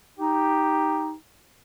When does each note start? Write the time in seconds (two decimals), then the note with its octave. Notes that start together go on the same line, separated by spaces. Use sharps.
0.19 D#4 G4